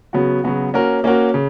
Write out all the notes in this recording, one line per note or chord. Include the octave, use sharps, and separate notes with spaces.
C#3 F#3 B3 F#4
C#3 F#3 B3 F#4
A#3 C#4 F#4 A#4
A#3 C#4 F#4 A#4
C#3